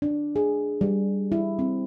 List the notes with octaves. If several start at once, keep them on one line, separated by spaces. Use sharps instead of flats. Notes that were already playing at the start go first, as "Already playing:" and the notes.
D4
G#4
G3
E4
C4